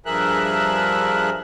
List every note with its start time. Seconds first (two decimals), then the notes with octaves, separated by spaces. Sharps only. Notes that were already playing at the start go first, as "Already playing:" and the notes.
0.06 G2 F3 G#4 A#4 E5 F#6